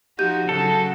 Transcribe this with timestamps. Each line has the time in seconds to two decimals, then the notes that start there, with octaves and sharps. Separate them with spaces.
0.19 F3 D#4 F#4 G4 G6 D#7
0.49 C#3 F#3 F#4 A4